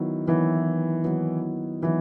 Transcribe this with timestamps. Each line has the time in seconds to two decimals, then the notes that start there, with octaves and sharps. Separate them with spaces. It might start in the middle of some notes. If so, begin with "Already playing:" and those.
Already playing: D#3 F#3 B3 E4
0.27 D#3 E3 F#3 B3 E4
1.04 D#3 F#3 B3 E4
1.82 D#3 E3 F#3 B3 E4